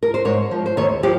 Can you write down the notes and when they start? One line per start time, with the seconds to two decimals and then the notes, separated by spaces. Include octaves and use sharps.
0.03 A#4
0.14 C5
0.25 G#2 C#5
0.51 F3
0.66 C5
0.77 D#2 C#5
1.03 F3 G4